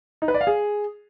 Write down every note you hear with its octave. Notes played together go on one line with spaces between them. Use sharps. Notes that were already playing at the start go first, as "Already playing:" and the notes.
D#4
B4
D5
F5
G#4